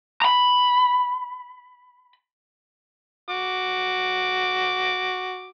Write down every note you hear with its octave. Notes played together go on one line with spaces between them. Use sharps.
A#5 B5
F#4 D6